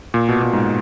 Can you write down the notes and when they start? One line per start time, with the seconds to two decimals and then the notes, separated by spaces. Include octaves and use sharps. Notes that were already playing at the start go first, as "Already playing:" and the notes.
0.14 A#2
0.29 B2
0.43 A#2
0.53 G#2